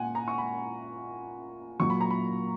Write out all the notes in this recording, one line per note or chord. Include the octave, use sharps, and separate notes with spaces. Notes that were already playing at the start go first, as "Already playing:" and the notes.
Already playing: A#2 F#5 G#5
A#5
C#6
B5
A#2 F#3 C#6
B5
A#5
B5